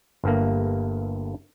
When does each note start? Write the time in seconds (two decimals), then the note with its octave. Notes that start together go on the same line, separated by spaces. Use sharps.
0.24 G1 G2 A3 A#3